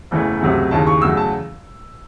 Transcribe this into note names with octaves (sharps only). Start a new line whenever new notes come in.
F#1 E2 C#3 E3 A3
C#2 C3 F#3 A3
D#2 C#3 E3 A5
C#6
E2 C#3 F#3 A3 E6
A5